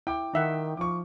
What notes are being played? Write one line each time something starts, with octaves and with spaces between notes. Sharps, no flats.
E4 G5 D6
D#3 D#4 E5 F#5
F3 C#6 D6